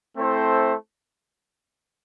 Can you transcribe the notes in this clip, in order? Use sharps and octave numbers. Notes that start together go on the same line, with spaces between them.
A3 C4 E4 A4 C5